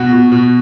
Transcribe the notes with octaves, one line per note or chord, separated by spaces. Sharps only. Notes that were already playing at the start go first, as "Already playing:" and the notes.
Already playing: B2 F#4
B2
B2